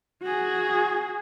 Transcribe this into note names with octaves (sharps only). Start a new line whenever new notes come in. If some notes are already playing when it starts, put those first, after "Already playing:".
F#4 G#4